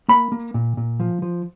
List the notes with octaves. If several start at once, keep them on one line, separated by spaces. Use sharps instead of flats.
A#3 B5
A#3
A#2
A#2
F3
F3